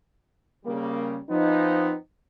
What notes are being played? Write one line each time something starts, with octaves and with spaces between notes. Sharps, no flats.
C#3 G3 A#3
F3 B3 C4 D#4